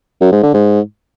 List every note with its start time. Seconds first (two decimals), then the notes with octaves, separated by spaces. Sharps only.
0.21 F#2
0.32 G#2
0.43 D3
0.54 G#2